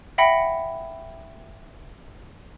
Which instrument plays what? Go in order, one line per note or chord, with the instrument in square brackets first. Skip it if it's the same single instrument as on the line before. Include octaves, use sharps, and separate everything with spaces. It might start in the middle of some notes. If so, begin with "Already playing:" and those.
[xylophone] E5 F#5 G5 B5 A#6 C#7